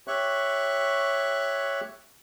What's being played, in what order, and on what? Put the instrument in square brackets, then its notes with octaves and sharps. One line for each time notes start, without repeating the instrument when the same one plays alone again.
[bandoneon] G4 C#5 E5 C#6 F#6